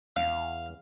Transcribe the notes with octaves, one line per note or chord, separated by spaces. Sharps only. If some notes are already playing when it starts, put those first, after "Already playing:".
E2 F5